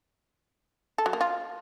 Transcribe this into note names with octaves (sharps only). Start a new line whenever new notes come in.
A4
F#3
A#3
F4